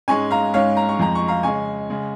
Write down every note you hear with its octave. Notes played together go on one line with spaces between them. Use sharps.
G#2 G#3 C#4 G#5 C#6
F5 A#5
G#2 G#3 C#4 C#5 F5
A#5
C#6
F2 F3 G#3 A#5
C#6
F5 A#5
C#3 G#3 C#4 G#5 C#6
C#3 G#3 C#4